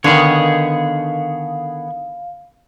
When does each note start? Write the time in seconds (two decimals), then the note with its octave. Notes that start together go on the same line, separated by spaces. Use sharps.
0.04 D3 D#3 B3 G#4 C#5 F5